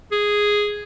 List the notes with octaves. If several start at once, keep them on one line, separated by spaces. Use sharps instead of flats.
G#4